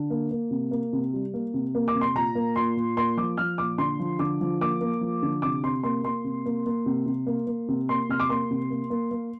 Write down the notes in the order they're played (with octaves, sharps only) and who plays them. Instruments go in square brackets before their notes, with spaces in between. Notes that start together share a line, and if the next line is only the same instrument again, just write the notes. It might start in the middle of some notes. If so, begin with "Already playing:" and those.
Already playing: [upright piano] D3
A#3
A#3
C3
A#3
C3
G3
A#3
C3
A#3
D6
C3
C6
A#2 A#5
A#3
A#2 C6
A#2
A#3 C6
F3 D6
F3 F6
A#2 D6
D3 C6
F3
D3 D6
F3
A#3 D6
A#3
F3
D3
C3 D6
C3 C6
A#3 C6
A#3 C6
C3
A#3
A#3
C3
C3
A#3
A#3
C3
A#3 C6
C3 F6
D6
A#3 C6
C3
A#3
A#3
A#3